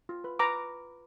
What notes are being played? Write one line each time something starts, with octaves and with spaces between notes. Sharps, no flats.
F4
B4
B4 A#5 D6